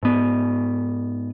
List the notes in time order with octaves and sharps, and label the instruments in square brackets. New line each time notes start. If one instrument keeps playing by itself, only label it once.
[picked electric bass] G#2 B3